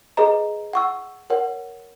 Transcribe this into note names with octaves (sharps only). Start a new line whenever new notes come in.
G#4 B4 D#5 A#5
F#5 C#6 E6
A#4 C#5 F#5